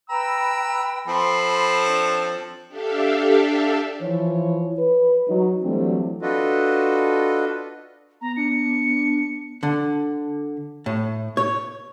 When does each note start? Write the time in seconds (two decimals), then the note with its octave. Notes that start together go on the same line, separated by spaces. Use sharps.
0.09 B4 G5 A#5 B5 E6
1.07 F3 C4 A4 B5 C6
1.85 D4 C#5
2.68 D4 G4 A4 E5 F5
4.01 E3 F3 C#5
4.79 B4
5.28 F#3 D#4
5.63 E3 F#3 G3 A3 C4 D4
6.22 D4 F4 F#4 A4 B4 D#5
8.21 B3 A#5
8.37 D4 C#7
9.63 D3
10.86 A2
11.37 C#5